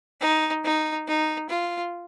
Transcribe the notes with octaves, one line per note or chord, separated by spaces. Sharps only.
D#4
D#4
D#4
F4